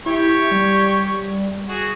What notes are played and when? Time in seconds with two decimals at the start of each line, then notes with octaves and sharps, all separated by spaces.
0.06 E4 G4 C#5 C#6
0.51 G3
1.68 F#4 G#4